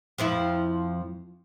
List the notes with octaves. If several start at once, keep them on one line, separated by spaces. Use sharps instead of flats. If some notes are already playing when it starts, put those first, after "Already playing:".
F2 F3 E4